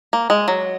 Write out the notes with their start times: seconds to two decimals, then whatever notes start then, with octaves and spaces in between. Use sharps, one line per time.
0.13 A#3
0.30 G#3
0.48 F#3